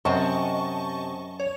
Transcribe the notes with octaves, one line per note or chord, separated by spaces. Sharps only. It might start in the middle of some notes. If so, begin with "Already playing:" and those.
F#2 C3 C4 D#5 A5 C#6
C#5